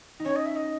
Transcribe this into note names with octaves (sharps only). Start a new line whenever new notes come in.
D#4
C#4 C#5
D#5
E5
D#5